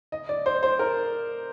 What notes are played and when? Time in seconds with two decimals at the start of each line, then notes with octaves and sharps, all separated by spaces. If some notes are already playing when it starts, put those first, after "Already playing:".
0.12 D#5
0.29 D5
0.46 C5
0.63 C5
0.79 A#4